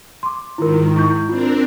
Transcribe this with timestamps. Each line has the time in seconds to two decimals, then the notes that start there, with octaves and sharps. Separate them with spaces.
0.23 C6 D6
0.58 G#2 D#3 E4 F4 A#4
0.96 E4 C#6 G6
1.29 C4 D4 F4 A#4